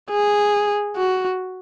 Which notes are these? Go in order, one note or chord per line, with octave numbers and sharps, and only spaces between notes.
G#4
F#4